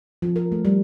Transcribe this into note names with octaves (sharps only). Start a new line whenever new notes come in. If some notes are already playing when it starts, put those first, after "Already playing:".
F3
A#4
A3
G3